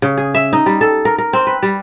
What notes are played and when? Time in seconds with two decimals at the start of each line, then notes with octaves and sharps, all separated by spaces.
0.02 C#3
0.17 G#4
0.35 E5
0.53 D#4
0.66 G3
0.81 A4
1.05 A#4
1.18 A#4
1.33 C4
1.47 B4
1.63 G3